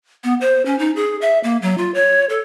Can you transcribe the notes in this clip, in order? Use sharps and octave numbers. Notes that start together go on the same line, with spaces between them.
B3
C5
C#4
D#4
G#4
E5
A#3
F#3
F4
C#5
A4